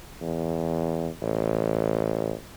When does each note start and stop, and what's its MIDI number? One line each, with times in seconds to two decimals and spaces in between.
0.21 1.09 40
1.22 2.33 33